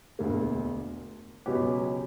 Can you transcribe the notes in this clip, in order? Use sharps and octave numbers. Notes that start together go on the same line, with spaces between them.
E1 D2 D3 A#3
C#2 B2 F#3 C#4 G4